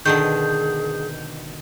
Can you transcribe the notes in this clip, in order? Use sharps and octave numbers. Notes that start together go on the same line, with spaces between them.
B2 D3 D#3 G#4 G6